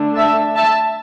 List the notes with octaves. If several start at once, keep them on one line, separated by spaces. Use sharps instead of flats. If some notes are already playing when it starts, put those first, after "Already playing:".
Already playing: D3 A3 D4
E5 A5
E5 A5